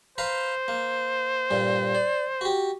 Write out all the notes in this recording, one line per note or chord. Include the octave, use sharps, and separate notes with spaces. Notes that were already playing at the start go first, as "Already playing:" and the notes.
B4 C5 F5 A#5
A#3
G2 A#2
D5
F#4 G4